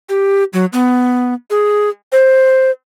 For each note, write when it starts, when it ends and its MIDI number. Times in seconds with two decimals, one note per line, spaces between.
0.09 0.44 67
0.53 0.65 54
0.73 1.34 59
1.50 1.89 68
2.12 2.71 72